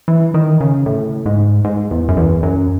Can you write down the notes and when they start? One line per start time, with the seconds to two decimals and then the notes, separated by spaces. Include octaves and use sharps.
0.08 E3
0.34 D#3
0.61 C#3
0.86 A2
1.26 G#2
1.65 G#2
1.91 E2
2.09 F#2
2.17 E2
2.43 F#2